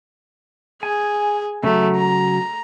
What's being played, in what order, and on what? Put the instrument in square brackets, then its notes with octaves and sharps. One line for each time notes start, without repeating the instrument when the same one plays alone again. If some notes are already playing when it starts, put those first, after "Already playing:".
[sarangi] G#4 [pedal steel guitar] G#5
[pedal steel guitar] C#3 F#3 [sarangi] A3
[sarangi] A#5